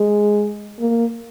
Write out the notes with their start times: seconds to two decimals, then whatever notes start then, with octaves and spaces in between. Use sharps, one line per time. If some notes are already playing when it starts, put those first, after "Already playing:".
Already playing: G#3
0.79 A#3